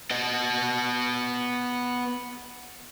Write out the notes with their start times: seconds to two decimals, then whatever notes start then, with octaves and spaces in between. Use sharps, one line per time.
0.11 B3 D#5